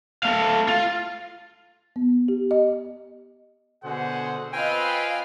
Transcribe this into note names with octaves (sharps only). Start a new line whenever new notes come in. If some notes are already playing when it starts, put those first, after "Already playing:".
A3 F5
F4
B3
G4
D#5
B2 D3 G#4 C5 F#5
C4 F4 B4 D#5 F5 G5 G#5